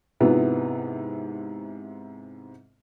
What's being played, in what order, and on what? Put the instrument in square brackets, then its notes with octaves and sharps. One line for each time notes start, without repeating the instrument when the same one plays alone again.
[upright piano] G#2 C3 B3 E4 F4